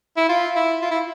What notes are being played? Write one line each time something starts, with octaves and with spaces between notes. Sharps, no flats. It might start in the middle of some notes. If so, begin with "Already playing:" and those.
E4
F4
E4
F4
E4